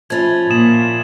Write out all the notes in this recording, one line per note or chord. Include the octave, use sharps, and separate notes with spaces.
F3 C#4 E4 G#6 A6
A#2 D#6 E7 F#7